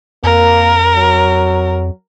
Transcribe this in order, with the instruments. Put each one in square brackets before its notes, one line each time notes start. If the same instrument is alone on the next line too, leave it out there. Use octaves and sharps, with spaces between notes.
[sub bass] F2 [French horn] A#3 [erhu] A#4
[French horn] F#3